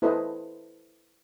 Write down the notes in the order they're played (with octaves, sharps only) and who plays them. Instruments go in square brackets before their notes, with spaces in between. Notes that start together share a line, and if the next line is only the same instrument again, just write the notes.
[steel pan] E4 A4 B4 C5 D#5